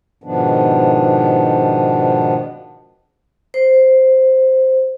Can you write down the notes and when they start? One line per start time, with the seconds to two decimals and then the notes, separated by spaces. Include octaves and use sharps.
0.24 G#2 B2 D#3 F3 B3 D4
3.54 C5